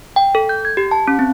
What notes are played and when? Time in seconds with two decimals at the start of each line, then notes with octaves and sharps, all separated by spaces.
0.16 G5
0.35 A4
0.49 G6
0.65 G#6
0.77 G4
0.91 A5
1.07 C#4
1.19 C4